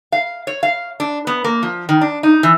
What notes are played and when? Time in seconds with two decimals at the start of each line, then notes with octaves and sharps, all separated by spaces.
0.12 F5
0.47 C#5
0.63 F5
1.00 D4
1.27 B3
1.44 A#3
1.63 F3
1.89 D#3
2.01 D4
2.23 D#4
2.43 E3